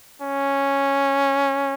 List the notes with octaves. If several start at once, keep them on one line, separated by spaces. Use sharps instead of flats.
C#4